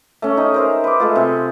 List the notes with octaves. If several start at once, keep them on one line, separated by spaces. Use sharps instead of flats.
A3 C#4
D#4 G#4 D#5
A#4 C5 E5
B4 D6
G#3 A3 F4
C3 G#4